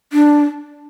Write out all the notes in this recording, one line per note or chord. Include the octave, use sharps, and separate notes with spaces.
D4